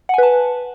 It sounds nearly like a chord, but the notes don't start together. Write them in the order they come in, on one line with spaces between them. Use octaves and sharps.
F#5 G#5 B4 A5